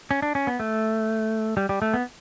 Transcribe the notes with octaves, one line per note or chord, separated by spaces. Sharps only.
C#4
D4
C#4
B3
A3
G3
G3
A3
B3